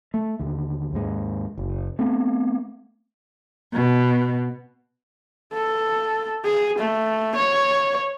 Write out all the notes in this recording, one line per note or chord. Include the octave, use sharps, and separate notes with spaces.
A3
D#2 D3
D#2 G#2 G#3
F#1
A3 B3 C4
B2
A4
G#4
A3
C#5